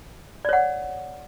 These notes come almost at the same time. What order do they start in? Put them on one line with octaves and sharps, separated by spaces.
D5 C#5 F#5